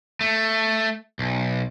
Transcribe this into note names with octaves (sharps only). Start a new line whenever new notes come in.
A3
B1